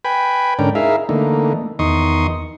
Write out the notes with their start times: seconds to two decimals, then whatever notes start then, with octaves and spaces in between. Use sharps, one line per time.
0.05 B4 G5 G#5 B5
0.59 G#2 D3 C#4 D4 A#4 G5
0.75 D#4 E4 G#4 A#4 E5 F5
1.09 D3 E3 A3 A#3 D#4
1.79 E2 D#3 D#4 C6 C#6 D#6